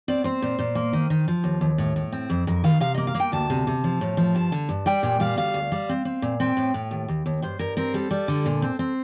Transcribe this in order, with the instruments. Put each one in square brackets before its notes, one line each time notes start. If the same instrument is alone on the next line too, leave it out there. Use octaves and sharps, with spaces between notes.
[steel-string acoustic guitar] C4 D5
C4 C5
A#2
A#2
A#3
D#3
D#3
F3
D#2
D#2
A2
A2
C4
F2
F2 A#4
D#3 F5
C3 F5
A#3 D#5
F5
A#3
G5
D2 A5
C3
C3
F3
A2
F3
G2 A5
D3
G2
G3 G5
A#2 G5
G3 F5
D2 F5
D2
G3
C4
C4
A#2
C4 G5
A2
A2
D#2
D#2
D#2
G2 C5
G2 A#4
C4 A#4
G3 A4
G3
D3
A#2
C4
C4